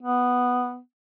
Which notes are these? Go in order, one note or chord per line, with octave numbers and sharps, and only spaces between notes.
B3